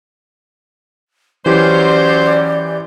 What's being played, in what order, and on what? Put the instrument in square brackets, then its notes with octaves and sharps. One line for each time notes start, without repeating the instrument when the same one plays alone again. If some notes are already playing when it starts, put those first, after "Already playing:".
[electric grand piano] E3 G4 [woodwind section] F#3 C#4 [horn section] C5 C6 [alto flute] D5